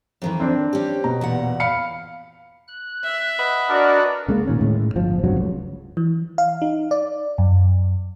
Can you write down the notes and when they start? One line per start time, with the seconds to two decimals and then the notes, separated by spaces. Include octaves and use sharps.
0.22 F2 D#3 E3
0.40 C4 D4
0.73 C#4 G4
1.04 B2 A#5
1.21 E2 A#2 F#5
1.60 F5 B5 C#7
2.68 F#6
3.03 E5
3.39 B4 D#5 F#5
3.69 D4 F#4 A#4 D5
4.28 C#3 G#3 A#3
4.47 A#2 D#3 C#4
4.61 A2 G#3
4.96 G1 F3
5.24 F1 B1 G2 F#3
5.37 C#2
5.97 E3
6.38 F5
6.62 D#4
6.91 D5
7.38 F#2